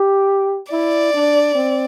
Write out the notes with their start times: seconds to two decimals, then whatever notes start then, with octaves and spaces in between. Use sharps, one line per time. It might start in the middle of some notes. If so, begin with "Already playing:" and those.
Already playing: G4
0.72 E4 D5
1.14 D4
1.55 C4